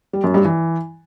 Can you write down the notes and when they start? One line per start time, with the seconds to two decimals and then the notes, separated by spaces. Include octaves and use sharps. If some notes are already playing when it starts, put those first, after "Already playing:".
0.13 G3
0.24 F#2
0.34 G2
0.45 E3